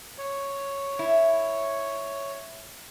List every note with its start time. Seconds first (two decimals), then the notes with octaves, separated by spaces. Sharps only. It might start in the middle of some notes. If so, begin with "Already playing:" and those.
0.18 C#5
0.99 E4